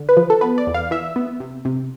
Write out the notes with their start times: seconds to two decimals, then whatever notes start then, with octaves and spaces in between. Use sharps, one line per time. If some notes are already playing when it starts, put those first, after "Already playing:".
Already playing: D3
0.09 B4
0.17 F3
0.30 A4
0.41 B3 B4
0.58 D5
0.67 E2
0.74 F5
0.91 E3 E5
1.16 B3
1.40 C3
1.65 C3